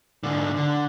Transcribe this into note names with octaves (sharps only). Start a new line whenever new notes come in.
G#2 D3
D3